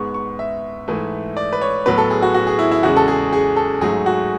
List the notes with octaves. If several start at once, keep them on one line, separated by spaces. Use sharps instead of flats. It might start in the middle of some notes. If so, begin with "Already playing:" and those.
Already playing: G#2 G#3 B3 C#6
C#6
E5
G#2 E3 A3
D5
B4
C#5
A2 F#3 B3 B4
A4
G#4
F#4
F#4
G#4
E4
E4
E2 C#3 G#3 F#4
A4
G#4
G#4
A4
G#2 F#3 A3 G#4
F#4